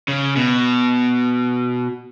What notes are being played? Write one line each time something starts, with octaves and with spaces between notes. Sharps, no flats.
C#3
B2